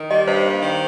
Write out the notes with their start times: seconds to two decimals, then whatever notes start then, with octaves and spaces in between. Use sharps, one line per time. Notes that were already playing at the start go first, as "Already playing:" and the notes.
Already playing: D#3
0.11 G3 D#5
0.27 G2 C5
0.45 A#3
0.62 D#3